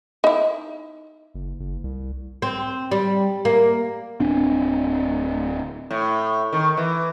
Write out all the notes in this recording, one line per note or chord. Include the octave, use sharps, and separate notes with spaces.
D#4 E4
F#1
F#1
C2
C4
G3
A#3
D1 C4 D4
A2
D#3
E3